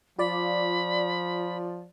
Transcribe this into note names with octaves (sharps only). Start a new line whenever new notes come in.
F3 F4 D5 B5